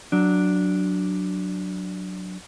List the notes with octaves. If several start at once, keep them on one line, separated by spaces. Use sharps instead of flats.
F#3 D4